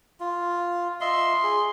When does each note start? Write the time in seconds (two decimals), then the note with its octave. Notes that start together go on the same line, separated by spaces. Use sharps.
0.20 F4
1.01 F4 D#5 E5 C6
1.43 G#4